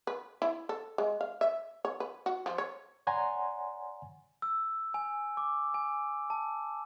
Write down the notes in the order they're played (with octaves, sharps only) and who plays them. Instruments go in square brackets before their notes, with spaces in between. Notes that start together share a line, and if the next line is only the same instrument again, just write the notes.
[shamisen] B4
E4
A4
G#3
F5
E5
C#5
B4
F#4
F3
C#5
[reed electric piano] C#5 D5 F#5 G#5 A#5 C6
[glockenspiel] E6
G#5
D6
G#5
A5